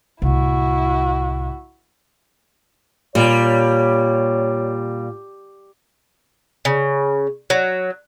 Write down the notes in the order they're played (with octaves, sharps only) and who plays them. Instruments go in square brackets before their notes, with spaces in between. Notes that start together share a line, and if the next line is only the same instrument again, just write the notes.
[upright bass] C2 A2 [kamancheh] E4 F#4
[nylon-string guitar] A#2 [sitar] G3 [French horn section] C#5
[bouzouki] C#3
F#3